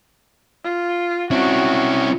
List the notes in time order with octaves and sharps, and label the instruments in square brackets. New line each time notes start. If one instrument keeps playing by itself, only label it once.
[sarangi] F4
[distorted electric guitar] C4 E4 [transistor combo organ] C#4 [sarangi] F#4